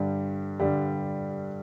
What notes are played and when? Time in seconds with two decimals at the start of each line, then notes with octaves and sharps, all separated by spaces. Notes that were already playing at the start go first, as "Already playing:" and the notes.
Already playing: G2 D3 G3
0.60 G2 D3 G3